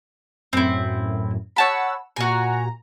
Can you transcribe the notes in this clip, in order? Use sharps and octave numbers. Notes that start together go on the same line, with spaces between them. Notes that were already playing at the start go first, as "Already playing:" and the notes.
F#2 A2 C4 E4
C#5 F#5 A5 B5 E6
A#2 F#4 G#5 A#5